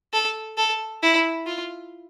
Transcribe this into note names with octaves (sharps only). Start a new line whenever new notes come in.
A4
A4
E4
F4